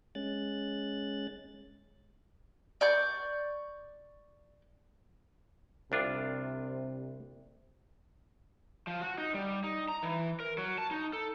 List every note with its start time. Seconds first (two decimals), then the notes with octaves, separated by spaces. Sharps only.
0.15 G#3 C#4 F#6 A6
2.81 D5 C#6 G6
5.92 C2 C3 D4 F4
8.87 F3
9.01 F#4
9.18 D#4
9.34 G3
9.64 D#4
9.89 A#5
10.03 E3
10.40 A#4
10.58 F#3
10.78 A5
10.91 D#4
11.13 A4